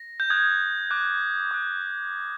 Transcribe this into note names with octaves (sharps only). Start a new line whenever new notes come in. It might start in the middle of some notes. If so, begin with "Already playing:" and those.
Already playing: A#6
G6
D#6 F#6 G#6
D6 F#6
D6 F#6